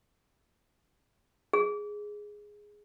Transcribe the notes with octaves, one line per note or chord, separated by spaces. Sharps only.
G#4